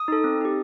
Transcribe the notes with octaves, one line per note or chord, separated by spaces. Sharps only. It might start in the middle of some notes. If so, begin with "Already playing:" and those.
Already playing: D#6
D#4 A4
C4
D#4 G4